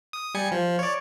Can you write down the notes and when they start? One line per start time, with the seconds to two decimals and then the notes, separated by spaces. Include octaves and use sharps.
0.13 D#6
0.34 G3 G#5 C#7
0.51 F3
0.79 C#5 D5